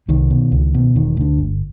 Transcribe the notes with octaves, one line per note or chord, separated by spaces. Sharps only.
C2 D#3
B2
C#2
B2
E1 D#3
D2 D3
G1